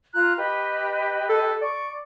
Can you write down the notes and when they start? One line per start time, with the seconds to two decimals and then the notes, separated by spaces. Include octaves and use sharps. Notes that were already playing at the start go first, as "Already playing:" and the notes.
0.14 F4 A#5 F#6
0.37 G4 B4 D#5
1.29 A4
1.62 D5 C#6